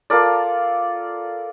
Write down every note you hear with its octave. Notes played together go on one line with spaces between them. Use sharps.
F4 A4 A#4 D5